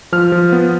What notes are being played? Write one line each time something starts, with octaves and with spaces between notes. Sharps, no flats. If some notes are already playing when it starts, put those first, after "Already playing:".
F3 F6
F3
B3